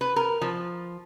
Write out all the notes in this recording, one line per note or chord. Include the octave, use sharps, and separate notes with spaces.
B4
A#4
F3